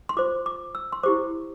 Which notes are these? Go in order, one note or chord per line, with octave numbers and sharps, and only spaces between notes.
C6
F4 C5 D6
D6
E6
C6
E4 G4 C5 D6